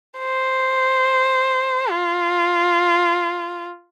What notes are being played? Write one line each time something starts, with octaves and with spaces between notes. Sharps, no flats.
C5
F4